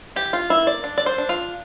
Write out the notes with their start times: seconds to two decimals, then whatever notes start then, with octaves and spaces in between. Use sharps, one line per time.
0.16 E3 G4
0.33 F4
0.50 A#3 E4
0.67 D5
0.84 D4
0.98 D5
1.06 C5
1.18 D4
1.29 F4